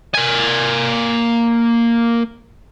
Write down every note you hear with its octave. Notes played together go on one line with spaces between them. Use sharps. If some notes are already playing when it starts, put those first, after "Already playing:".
A#3 G#5